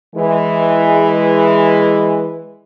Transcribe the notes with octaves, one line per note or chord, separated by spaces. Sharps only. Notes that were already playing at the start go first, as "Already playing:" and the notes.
E3 G#3